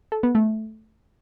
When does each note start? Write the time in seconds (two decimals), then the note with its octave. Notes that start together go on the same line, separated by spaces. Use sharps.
0.12 A4
0.23 B3
0.35 A3